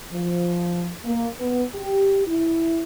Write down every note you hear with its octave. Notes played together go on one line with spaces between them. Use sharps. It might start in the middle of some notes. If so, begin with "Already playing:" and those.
F3
A#3
B3
G4
E4